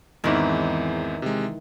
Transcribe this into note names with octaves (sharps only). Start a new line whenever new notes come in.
E2 G#2 D#3 E3 C4
C3 G#3